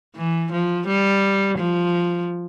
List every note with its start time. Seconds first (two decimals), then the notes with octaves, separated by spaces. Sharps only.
0.16 E3
0.52 F3
0.87 G3
1.58 F3